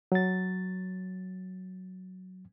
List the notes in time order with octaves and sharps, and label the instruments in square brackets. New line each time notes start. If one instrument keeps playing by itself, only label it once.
[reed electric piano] F#3 A6